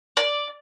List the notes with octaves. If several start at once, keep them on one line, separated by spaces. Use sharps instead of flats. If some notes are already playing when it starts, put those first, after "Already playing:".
D5